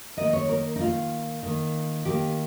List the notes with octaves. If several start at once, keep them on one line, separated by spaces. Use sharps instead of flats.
D#3 A#3 D#5
C#5
A#4
D#4
D#3 A#3 F4
D#3 A#3
D#3 A#3 G4